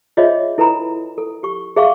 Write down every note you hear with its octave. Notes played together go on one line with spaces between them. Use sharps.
F4 G#4 C5 C#5 D#5 E5
E4 A4 B4 G#5 A#5 B5
A4
G4 C#6
G#4 E5 F5 C6 C#6